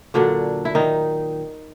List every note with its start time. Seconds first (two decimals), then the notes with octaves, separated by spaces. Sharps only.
0.14 A#2 D3 F#3 D4
0.65 E4
0.75 D#3 D#4